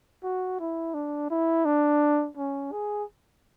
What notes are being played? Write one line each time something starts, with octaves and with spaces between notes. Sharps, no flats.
F#4
E4
D4
E4
D4
C#4
G#4